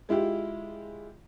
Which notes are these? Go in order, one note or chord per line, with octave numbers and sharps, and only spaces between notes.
G#3 E4 F4 G4